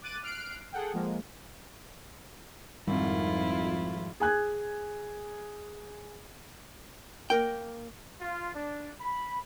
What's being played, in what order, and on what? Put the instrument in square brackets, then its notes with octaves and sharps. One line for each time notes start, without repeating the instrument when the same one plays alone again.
[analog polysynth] D6 F#6 A6 D#7
F6 F#6 C7 D7
G#4 A4 F#5 G5
F3 G#3 A#3
[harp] G#1 [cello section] F2 [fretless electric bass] G3 C4 [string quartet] E4 F4
[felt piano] G#4 G#5 F#6 G#6
[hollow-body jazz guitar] A#3 A#4 G5
[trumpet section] F4
D4
B5